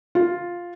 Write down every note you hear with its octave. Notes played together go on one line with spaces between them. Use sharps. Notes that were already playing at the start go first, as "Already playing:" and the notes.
F4